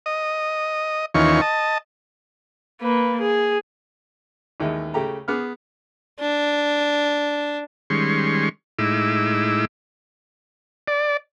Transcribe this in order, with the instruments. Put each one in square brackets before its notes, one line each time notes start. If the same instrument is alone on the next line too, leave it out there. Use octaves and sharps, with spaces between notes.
[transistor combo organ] D#5
D#2 D#3 E3 C#4 F4 C#6
D#5 A5
[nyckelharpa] A#3 B4
G#4
[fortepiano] A1 D#2 G#3
C#3 A3 G4 A#5
B3 G#4 D6 F6
[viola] D4
[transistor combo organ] D#3 G3 G#3 C#4 C6 C#6
A2 G#3 D#4 E4 D6 E6
D5